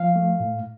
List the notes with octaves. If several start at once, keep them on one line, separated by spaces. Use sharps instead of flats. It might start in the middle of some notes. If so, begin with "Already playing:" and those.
Already playing: F3 F5
A3
A2